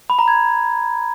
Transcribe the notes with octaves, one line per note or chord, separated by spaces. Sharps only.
B5
A#5
G#6